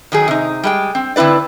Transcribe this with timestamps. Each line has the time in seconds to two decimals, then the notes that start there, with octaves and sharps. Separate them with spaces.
0.12 D#3 F#3 D#4 G#4
0.28 C3 D#4
0.63 G3 G#3 G5
0.95 C4
1.16 D3 C4 E4 B4 D5